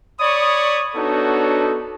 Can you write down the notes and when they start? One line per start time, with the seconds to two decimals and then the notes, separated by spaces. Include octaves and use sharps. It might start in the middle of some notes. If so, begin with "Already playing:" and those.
0.20 C#5 D5 B5 C#6 D#6
0.96 B3 D4 D#4 F#4 A4 C#5